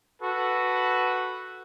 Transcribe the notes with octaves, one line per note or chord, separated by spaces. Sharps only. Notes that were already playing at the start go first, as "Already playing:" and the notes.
F#4 A4 B4